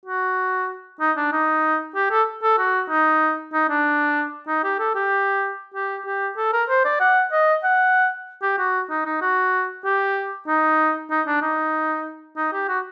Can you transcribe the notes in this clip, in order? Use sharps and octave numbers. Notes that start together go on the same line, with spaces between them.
F#4
D#4
D4
D#4
G4
A4
A4
F#4
D#4
D#4
D4
D#4
G4
A4
G4
G4
G4
A4
A#4
C5
D5
F#5
D#5
F#5
G4
F#4
D#4
D#4
F#4
G4
D#4
D#4
D4
D#4
D#4
G4
F#4